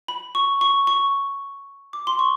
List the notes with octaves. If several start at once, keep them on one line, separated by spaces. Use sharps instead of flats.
B5
C#6
C#6
C#6
D6
C6
C#6